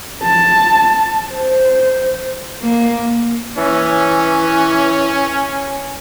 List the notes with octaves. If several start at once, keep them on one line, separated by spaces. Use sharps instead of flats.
A5
C5
A#3
E3 C#4